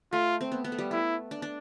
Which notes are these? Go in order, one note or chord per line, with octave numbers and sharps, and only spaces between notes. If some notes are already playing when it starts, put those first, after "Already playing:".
A3 F4
C4
B3
B3
A3
G3
A3 E4
D4
D4